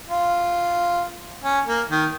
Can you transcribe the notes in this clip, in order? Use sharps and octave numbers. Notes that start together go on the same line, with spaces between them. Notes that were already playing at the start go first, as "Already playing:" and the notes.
F4
C#4
A#3
D#3